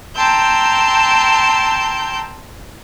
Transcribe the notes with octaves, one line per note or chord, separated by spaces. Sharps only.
G5 A5 A#5 C6 E6 G6